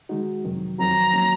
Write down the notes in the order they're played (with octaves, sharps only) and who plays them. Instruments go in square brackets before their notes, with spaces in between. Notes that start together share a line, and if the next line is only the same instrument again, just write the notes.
[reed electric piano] D#3 G#3 D#4 F#4
F2 C3 D#3 F#3
[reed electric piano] F2 D#3 F#3 C4 F#4 [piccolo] A#5
[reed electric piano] D#3 F#3 A#3 C#4